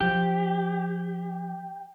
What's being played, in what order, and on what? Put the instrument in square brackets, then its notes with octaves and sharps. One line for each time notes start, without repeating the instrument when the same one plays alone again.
[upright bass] F3 [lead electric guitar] G4